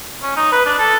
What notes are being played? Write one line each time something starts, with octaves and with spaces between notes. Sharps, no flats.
C#4
D#4
B4
D4
A4